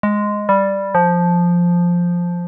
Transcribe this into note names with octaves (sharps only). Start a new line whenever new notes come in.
G#3
G3
F3